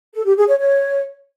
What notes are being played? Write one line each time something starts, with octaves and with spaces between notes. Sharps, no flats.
A4
G4
G#4
C#5
C#5